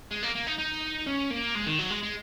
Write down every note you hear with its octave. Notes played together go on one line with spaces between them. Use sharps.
G#3
A#3
A#3
D#4
D#4
C#4
A#3
G#3
D#3
F#3
G#3
G#3